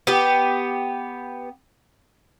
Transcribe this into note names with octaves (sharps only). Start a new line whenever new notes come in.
B3 G4